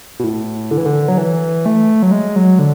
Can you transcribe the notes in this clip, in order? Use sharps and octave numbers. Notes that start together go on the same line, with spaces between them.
B2
A2
D3
E3
D3
F#3
E3
A3
F#3
G#3
F#3
D3